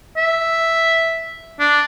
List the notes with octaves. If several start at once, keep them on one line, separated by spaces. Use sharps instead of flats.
E5
D4